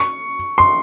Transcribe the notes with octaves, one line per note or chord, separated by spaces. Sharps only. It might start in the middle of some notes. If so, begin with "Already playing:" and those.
Already playing: C#6
C6